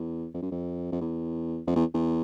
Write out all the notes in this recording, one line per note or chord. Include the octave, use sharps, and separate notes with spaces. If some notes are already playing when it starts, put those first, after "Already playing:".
Already playing: E2
F2
F#2
F2
F2
E2
F2
E2
E2